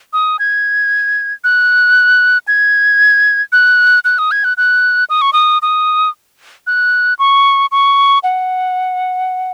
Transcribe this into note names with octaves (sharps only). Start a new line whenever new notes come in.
D#6
G#6
F#6
G#6
F#6
F#6
D#6
G#6
F#6
F#6
D#6
C#6
D#6
D#6
F#6
C#6
C#6
F#5